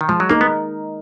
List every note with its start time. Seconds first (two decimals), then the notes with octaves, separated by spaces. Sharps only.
0.01 D#3
0.09 F3 G#3
0.20 F#3
0.30 A#3 D#4 A#4
0.41 B3